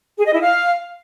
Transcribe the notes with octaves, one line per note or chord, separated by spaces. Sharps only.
G#4
D#5
E4
F5